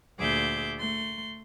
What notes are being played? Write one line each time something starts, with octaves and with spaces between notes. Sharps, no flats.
D2 A#2 G#4 E5 D6 G6
A3 C6